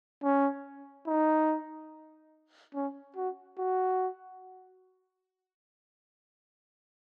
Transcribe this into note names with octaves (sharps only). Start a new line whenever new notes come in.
C#4
D#4
C#4
F#4
F#4